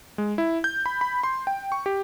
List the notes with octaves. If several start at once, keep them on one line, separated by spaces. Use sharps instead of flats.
G#3
E4
G6
B5
B5
C6
G5
C#6
G4